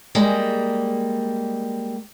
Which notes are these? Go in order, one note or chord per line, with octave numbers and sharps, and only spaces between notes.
G3 G#3 A#3